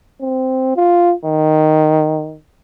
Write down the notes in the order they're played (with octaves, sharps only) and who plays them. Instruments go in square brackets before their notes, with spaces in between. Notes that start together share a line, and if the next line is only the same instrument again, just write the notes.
[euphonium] C4
F4
D#3